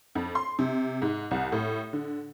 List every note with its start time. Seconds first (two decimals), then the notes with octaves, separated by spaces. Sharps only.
0.15 F2
0.35 C6
0.59 C3
1.02 G#2
1.31 C2
1.52 A2
1.93 D3